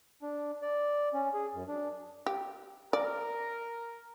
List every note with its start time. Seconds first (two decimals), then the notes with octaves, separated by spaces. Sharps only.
0.22 D4
0.62 D5
1.14 C#4
1.34 G#4
1.54 F#2
1.68 D4
2.26 G4
2.93 A#4 D5